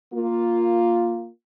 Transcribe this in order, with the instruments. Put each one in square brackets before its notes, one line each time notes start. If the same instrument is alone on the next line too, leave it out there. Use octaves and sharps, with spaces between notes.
[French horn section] A#3 F4